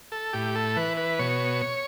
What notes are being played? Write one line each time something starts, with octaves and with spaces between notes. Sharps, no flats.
A4
A2 G4
A4
E3 B4
B4
B2 C#5